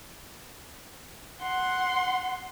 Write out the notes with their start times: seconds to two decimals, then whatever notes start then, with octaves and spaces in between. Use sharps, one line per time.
1.41 F#5 C6